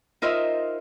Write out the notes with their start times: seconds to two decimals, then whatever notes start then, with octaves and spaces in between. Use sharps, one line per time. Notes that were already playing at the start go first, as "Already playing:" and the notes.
0.22 D#4 F4 A#4 C5 D#5 E5